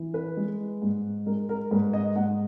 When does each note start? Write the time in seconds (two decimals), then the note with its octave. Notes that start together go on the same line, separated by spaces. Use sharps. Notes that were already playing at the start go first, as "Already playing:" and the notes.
Already playing: E3
0.14 B4
0.37 G#3
0.82 G#2
1.26 G#3 A#4
1.49 A#4
1.71 G#2 B4
1.93 D#5
2.16 G#2 F#5